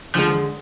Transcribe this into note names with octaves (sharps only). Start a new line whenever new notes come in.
D3 F3 G#3